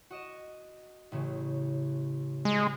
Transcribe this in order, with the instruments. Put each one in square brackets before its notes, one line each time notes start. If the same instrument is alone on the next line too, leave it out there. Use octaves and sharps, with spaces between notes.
[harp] F#4 D#5 E7
A1 C#3
[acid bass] G#3